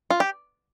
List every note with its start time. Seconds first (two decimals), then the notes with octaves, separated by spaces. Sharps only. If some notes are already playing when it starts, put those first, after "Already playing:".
0.10 F4
0.20 G4